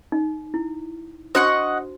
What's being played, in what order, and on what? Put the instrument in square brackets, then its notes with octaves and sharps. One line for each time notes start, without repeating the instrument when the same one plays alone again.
[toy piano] D#4
E4
[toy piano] D4 F#4 C5 [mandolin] D#5 F#5 C#6